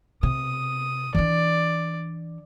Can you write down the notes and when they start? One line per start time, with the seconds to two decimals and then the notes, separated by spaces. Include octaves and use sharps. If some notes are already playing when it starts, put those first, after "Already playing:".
0.23 C3 D#6
1.15 E3 D4 D5